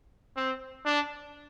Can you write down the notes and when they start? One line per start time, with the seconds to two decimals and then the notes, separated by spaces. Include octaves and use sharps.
0.37 C4
0.85 D4